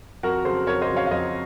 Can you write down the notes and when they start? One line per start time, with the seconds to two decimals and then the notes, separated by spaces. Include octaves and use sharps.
0.23 F2 F#4 A#4
0.45 C#3 F#3 A4 C5
0.67 F2 A#4 C#5
0.82 C5 D#5
0.89 C#3 F#3
0.96 C#5 F5
1.07 F5
1.11 F2 C5 D#5